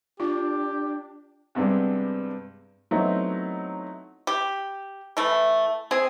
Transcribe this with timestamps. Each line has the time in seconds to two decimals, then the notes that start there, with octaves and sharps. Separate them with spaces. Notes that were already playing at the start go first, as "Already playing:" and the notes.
0.20 D4 F4 G4
1.55 G2 C3 G#3 B3 C4 D4
2.91 F#3 A3 B3 C4 D#4 E4
4.27 G4
5.17 E3 A3
5.91 C4 G#4